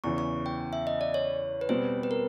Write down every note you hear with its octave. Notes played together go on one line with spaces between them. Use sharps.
E2 C#3 E3 C#6
C#6
G5
E5
D#5
D5
C#5
B4
B2 G3 C4 C5
B4
A#4